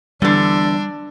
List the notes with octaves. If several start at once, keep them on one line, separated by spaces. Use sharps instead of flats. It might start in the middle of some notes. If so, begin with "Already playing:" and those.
E2 D3 G3 D4